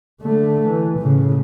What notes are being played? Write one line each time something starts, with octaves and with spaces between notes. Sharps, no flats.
D3 A3
E3
A2 C#3